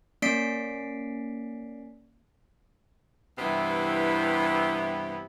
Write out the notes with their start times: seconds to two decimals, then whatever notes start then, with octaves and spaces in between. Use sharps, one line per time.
0.22 A#3 C#4 D5 B6 C7 D7
3.38 G2 C3 E3 B3 E4 G4